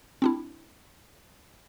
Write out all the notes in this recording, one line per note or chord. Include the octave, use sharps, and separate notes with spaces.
C4 D4 E4